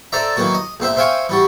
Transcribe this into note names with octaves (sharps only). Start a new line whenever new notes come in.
A4 C5 D5 E5 A#5
D#3 E3 F#3 A#3 F#4
D#5
A#1 C4 C5 E5
C5 E5 F5 G5 G#5 C#6
E3 G3 F#4